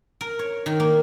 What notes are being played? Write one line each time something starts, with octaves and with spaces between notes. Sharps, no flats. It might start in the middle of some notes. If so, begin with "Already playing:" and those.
A#4
C#5
D#3
A#3